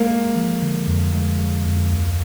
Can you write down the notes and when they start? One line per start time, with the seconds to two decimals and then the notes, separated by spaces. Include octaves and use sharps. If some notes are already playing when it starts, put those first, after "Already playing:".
Already playing: G#3 A#3
0.11 G#3
0.36 F3
0.62 D3
0.88 F2
1.14 G#3
1.40 G#3
1.65 F2
1.91 D2